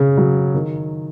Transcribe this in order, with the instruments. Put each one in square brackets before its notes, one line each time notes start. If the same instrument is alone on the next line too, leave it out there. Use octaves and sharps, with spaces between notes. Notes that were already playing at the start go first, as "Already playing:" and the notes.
Already playing: [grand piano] C#3
F#3
D#3